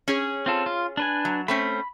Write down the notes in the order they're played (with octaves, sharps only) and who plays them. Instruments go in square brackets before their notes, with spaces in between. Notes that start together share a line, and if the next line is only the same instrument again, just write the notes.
[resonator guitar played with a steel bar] C#4 G#4 C#5
[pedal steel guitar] C4 F4 A4
F4
D4 B4 G#5
[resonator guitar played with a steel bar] F#3
[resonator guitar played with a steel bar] A3 C4 C#4 [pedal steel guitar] B5